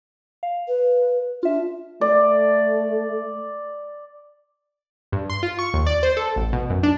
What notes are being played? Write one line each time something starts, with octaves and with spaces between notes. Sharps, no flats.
F5
B4
D4 F4 E5
A3 D5
G2
C6
F4
C#6
D#2
D5
C5
A4
A1
B2
F#2
D4